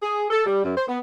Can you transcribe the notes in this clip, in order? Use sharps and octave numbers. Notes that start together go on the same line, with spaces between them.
G#4
A4
G3
F#2
C5
B3